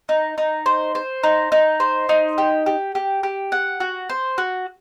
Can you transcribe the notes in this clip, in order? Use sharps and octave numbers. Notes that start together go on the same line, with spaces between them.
D#4
D#4
C5
C5
D#4
D#4
C5
D#4
G4
G4
G4
G4
F#5
F#4
C5
F#4